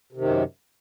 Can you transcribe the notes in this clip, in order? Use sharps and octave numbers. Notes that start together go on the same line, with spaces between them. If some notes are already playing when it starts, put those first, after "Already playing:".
F#2 C3 D#3